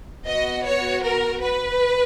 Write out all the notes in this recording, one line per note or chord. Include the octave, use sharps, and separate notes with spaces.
B3 F#4 D#5
C#5
A#4
B4